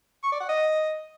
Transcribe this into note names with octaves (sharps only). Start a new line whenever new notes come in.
C#6
D5
F#5
D#5